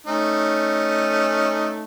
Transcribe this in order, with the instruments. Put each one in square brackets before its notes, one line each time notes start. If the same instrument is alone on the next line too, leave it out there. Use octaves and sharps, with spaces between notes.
[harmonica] A3 C#4 D#4